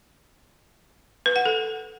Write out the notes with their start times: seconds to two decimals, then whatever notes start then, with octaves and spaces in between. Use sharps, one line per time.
1.26 B4
1.36 F#5
1.46 A4